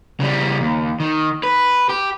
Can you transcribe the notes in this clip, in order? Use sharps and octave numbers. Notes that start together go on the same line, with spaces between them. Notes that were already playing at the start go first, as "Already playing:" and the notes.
C#3 G3
D#2
D#3
B4
G4